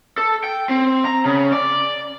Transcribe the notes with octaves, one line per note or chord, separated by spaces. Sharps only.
A4
G5
C4
A#5
C#3
D5